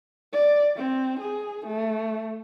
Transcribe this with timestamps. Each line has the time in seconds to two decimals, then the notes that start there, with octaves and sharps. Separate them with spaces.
0.34 D5
0.76 C4
1.20 G#4
1.66 A3